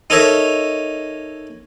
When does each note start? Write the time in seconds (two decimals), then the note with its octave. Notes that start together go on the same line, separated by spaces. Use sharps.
0.10 D#4 A4 A#4 C#5 D#5 E5